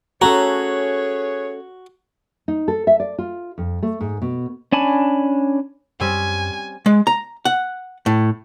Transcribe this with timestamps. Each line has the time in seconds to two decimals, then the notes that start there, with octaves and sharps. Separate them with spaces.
0.22 A3 C#4 F#4 G#4 A4 B4 C#5 A#5
2.48 D#4
2.68 A4
2.87 E5
3.00 D5
3.18 F4
3.58 F2
3.82 A3
4.01 G#2
4.22 B2
4.72 C#4 D4 G#5 A5 B5
6.00 F#2 G3 C4 C#4 G#5
6.86 G#3
7.07 A#5
7.45 F#5
8.06 A2